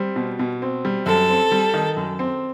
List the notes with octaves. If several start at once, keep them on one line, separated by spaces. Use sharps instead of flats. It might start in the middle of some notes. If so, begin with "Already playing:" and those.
Already playing: G3 C4
B2
B2
C4
G3
F#2 A4
C4
G3
D#3
F#2
C4